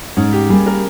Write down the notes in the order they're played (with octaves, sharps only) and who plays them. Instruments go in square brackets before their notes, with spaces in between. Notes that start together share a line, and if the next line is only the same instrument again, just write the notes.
[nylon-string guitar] G#2 [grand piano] C#4
[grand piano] G4
[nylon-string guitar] G3 A#3 [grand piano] G#4
[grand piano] A#4